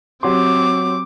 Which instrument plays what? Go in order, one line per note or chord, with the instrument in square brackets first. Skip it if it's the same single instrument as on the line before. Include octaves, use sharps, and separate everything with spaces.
[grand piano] F#3 G4 C6 [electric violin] C4 D6